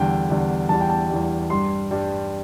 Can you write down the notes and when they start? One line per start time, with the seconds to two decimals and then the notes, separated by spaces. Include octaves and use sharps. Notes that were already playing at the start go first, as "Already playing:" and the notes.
Already playing: E2 D3 G3 G5
0.29 E2 D3 G3
0.69 E2 E3 G3 A5
0.81 G5
0.90 A5
1.10 E2 E3 G3
1.50 G2 G3 C6
1.91 G2 G3